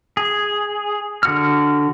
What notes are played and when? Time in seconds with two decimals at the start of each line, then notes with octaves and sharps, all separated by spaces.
0.17 G#4
1.23 D3 F#4 F6